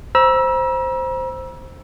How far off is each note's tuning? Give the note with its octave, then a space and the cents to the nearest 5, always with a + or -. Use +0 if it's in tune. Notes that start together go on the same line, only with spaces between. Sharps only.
C5 +0 A#5 +45 E6 +0